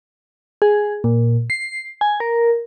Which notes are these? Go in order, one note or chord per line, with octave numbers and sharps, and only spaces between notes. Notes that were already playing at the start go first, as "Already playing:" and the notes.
G#4
A#2
C7
G#5
A#4